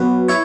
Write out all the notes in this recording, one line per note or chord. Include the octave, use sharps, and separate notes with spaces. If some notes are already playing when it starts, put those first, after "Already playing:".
Already playing: F#3 B3 F#4 B4
E4 C#5